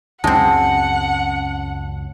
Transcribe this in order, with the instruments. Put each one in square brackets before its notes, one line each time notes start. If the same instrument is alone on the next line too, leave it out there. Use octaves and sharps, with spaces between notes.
[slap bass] C#2 F#2 C#4 [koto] G#3 C4 [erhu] F#5 [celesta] A5